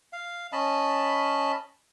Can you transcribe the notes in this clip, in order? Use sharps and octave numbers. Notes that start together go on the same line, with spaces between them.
F5
C#4 D#5 A5 B5